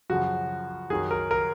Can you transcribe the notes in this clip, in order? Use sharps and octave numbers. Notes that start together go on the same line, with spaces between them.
F#2 C#3 F3 F#4
F#2 D#3 F#3 G#4
A#4
A#4